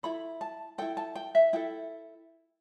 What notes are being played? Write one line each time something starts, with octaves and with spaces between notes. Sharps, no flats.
E4 A4 B5
A5
E4 A4 G5
A5
G5
E5
E4 A4 G5